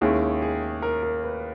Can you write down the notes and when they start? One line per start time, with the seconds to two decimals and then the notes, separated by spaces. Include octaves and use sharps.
0.01 D#2 D#3 G#3 C#4 E4 G#4
0.42 G#4
0.82 A#4
1.03 A#4
1.24 B4